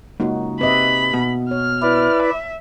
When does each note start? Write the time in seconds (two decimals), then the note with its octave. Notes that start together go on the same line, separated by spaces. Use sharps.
0.20 C#2 F#2 A#3 D#4 F#4
0.61 C3 B4 D#5 E5 B5
1.14 B2
1.51 C#5 F6
1.82 E4 B4 D5
2.23 E5